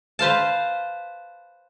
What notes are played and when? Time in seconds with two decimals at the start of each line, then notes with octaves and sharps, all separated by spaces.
0.19 B4 C5 F5 A5